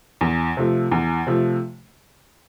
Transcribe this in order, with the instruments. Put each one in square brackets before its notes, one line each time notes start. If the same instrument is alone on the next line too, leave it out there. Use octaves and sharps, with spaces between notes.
[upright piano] E2
C3 F3 A3
E2
C3 F3 A3